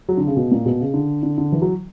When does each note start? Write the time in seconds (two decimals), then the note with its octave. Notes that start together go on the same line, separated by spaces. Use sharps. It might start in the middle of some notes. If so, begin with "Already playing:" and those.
0.09 F#3
0.17 D3
0.27 C#3
0.37 B2
0.52 A#2
0.66 B2
0.81 C#3
0.94 D3
1.23 D3
1.38 D3
1.52 E3
1.62 F#3